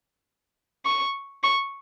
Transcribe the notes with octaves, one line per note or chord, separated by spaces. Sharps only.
C#6
C#6